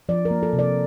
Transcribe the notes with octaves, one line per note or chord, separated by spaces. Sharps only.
F3 D5
A#4
A#3
A4
C3
D5